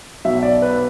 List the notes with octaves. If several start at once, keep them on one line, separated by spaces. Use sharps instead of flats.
B1 B2 E5
D5
B4